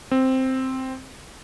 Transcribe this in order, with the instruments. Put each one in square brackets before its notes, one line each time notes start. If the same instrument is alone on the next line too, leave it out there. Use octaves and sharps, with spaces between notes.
[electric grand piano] C4